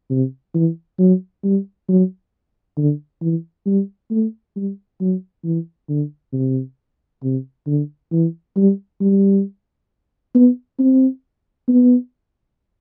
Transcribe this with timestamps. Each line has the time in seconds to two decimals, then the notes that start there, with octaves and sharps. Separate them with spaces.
0.10 C3
0.54 E3
0.99 F#3
1.44 G3
1.89 F#3
2.77 D3
3.22 E3
3.66 G3
4.11 A3
4.56 G3
5.01 F#3
5.44 E3
5.89 D3
6.33 C3
7.23 C3
7.67 D3
8.12 E3
8.57 G3
9.01 G3
10.35 B3
10.80 C4
11.68 B3